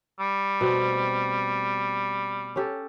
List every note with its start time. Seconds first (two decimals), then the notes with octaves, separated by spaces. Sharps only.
0.20 G3
0.61 B2 A3 C4
2.56 C#4 G4 A4